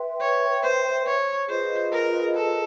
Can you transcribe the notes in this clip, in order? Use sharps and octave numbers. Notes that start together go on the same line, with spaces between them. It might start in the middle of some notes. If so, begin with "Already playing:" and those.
Already playing: B4 E5 G5 C6
C#5
C5
C#5
F4 G#4 B4 C5 D#5
A#4
A4